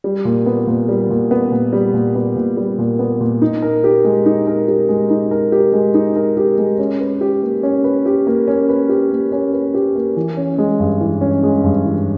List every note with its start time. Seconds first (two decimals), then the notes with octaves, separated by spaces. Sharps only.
0.04 G3
0.25 A#2
0.46 B3
0.67 A#2
0.89 G3
1.10 A#2
1.31 B3
1.52 A#2
1.73 G3
1.94 A#2
2.15 B3
2.36 A#2
2.57 G3
2.78 A#2
2.99 B3
3.20 A#2
3.42 D#4
3.62 A#4
3.84 G4
4.04 G#3
4.26 D#4
4.47 A#4
4.68 G4
4.89 G#3
5.10 D#4
5.31 A#4
5.52 G4
5.73 G#3
5.94 D#4
6.16 A#4
6.37 G4
6.58 G#3
6.79 C#4
7.01 B4
7.21 G4
7.43 A#3
7.63 C#4
7.84 B4
8.06 G4
8.27 A#3
8.48 C#4
8.69 B4
8.89 G4
9.11 A#3
9.32 C#4
9.53 B4
9.74 G4
9.96 A#3
10.17 E3
10.37 C#4
10.58 G#3
10.80 G2
11.01 E3
11.21 C#4
11.43 G#3
11.64 G2
11.85 E3